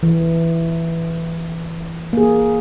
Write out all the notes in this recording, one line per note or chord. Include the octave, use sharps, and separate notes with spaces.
E3
A#3 G#4